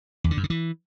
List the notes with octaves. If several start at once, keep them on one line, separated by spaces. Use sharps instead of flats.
E2
D3
F#2
C#3
E3